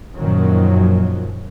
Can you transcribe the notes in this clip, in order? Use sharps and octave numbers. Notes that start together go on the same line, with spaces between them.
F#2 A#2 D#3 F3 F#3